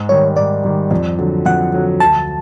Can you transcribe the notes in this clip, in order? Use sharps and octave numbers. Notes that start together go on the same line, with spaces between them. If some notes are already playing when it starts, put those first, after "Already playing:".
Already playing: G#2
D#3 G3 C#5
G#2 D5
D#3 G3
F2
D3 F#3
F2 F#5
D3 F#3
D2 A5